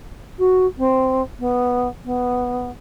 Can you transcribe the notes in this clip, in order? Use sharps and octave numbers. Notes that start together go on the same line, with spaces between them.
F#4
C4
B3
B3